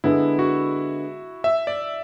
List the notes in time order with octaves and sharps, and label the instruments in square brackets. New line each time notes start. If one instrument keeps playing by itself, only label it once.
[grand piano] D3 G#3 B3 [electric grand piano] E4
[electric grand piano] F#4
E5
D5